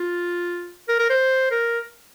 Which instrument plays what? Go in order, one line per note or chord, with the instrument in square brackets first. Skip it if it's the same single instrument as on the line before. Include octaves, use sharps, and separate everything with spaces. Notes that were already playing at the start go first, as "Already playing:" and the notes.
Already playing: [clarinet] F4
A#4
A#4
C5
A#4